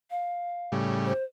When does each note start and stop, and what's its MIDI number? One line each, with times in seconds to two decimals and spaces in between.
0.11 0.73 77
0.72 1.13 45
0.72 1.13 49
0.72 1.13 55
1.06 1.24 72